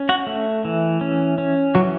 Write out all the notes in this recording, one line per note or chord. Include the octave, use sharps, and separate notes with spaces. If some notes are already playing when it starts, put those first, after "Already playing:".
Already playing: C#4
F#4 F#5
A3
E3
C#4
C#4
E3 F#3 F#4